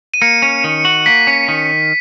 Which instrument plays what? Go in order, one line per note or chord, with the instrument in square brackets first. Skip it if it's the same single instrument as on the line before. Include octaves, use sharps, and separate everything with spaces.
[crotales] D#7
[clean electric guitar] A#3 [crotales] C#7
[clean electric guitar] C#4
D#3
F#4
[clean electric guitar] A#3 [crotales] B6
[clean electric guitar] C#4
D#3